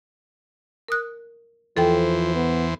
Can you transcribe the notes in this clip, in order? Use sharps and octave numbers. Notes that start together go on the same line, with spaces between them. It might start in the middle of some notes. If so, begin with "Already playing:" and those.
A#4 D#6 F#6
E2 E3 F3 A4 C5 G5
B3